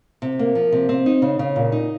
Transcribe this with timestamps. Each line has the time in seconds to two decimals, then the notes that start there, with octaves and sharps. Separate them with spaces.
0.22 C3
0.39 A#3
0.55 F3
0.72 C3
0.89 C4
1.06 D#4
1.22 C#3
1.39 C#3
1.56 A#2
1.72 D#4